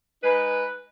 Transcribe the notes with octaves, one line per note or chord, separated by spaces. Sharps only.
G#3 D#4 B4